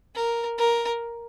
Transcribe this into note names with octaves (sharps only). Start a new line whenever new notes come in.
A#4
A#4